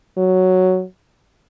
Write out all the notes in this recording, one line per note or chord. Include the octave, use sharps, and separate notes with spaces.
F#3